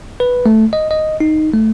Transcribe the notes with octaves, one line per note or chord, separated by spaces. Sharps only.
B4
A3
D#5
D#5
D#4
A3